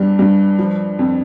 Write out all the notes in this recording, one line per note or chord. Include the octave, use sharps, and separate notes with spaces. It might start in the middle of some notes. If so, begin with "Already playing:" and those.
Already playing: G2 G3
G2
F3
F2